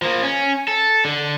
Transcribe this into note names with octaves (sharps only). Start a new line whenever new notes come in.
F3 A#3
C#4
A4
D3